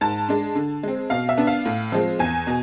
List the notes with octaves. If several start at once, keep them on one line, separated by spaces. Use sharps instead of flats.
G#2 A5
G#3 D4
D3
G#3 C4
B2 F5
E5
B3 D4
F5
A2
F3 G#3 C4
E2 G#5
B2